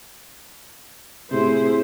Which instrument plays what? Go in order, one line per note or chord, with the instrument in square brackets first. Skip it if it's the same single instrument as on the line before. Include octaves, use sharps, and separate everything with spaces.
[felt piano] A2 C3 [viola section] E4 G#4 C5